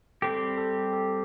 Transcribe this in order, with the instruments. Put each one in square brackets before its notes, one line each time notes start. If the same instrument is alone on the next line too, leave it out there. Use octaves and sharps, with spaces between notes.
[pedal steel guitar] G3 C4 G4 [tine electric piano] A4
[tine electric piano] A4
A4